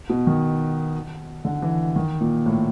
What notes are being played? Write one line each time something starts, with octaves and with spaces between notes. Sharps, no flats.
B2
D#3
D3
E3
D#3
A#2
A2